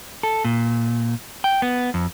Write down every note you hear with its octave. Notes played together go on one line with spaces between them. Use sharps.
A4
A#2
G5
B3
F2